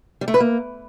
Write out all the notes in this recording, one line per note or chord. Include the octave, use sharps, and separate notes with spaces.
G3
A3
B4
A#3